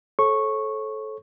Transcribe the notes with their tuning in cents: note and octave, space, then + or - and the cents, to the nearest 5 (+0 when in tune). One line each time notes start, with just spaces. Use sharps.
A4 -20 C#5 -40 C#6 -10